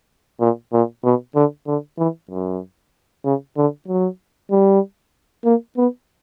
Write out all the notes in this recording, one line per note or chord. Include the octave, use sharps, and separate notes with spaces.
A#2
A#2
B2
D3
D3
E3
F#2
C#3
D3
F#3
G3
A#3
B3